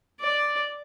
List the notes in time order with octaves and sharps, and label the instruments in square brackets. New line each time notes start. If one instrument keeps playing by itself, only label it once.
[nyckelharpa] D5